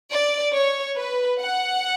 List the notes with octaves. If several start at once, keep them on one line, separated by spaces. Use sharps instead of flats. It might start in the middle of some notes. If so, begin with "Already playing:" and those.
D5
C#5
B4
F#5